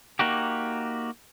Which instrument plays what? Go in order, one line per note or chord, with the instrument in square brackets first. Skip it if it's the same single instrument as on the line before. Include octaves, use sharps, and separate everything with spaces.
[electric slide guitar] A#3 D#4 F#4 G4